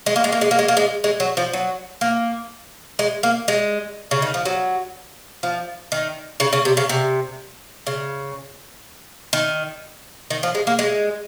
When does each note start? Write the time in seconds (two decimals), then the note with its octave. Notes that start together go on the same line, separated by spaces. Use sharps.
0.06 G#3
0.16 A#3
0.24 G#3
0.32 A#3
0.41 G#3
0.51 A#3
0.59 G#3
0.68 A#3
0.77 G#3
1.04 G#3
1.20 F#3
1.37 F3
1.53 F#3
2.01 A#3
2.99 G#3
3.23 A#3
3.48 G#3
4.11 C#3
4.22 D#3
4.34 F3
4.45 F#3
5.43 F3
5.92 D#3
6.40 C#3
6.53 C#3
6.65 C3
6.77 C#3
6.89 C3
7.87 C#3
9.33 D#3
10.30 D#3
10.43 F3
10.55 G#3
10.67 A#3
10.79 G#3